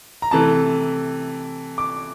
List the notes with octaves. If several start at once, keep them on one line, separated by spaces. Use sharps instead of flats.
A#5
C3 E3 A3 A5
D6